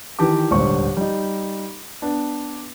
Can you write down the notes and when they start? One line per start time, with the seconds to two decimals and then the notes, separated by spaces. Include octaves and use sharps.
0.19 D#3 E3 G4 A5 D6
0.51 D#1 G#1 D2 D3 C5 C#6
0.97 G3 D#4
2.02 B3 D4